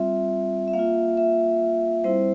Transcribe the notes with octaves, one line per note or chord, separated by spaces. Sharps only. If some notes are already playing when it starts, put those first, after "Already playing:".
Already playing: G3 C4 F4 E5
E5
A#3 F5
F4
E5
G3 C4 E4 C5